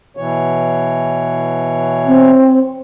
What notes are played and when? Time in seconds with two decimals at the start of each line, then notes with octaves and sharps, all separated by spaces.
0.17 B2 E3 C#5
2.06 C4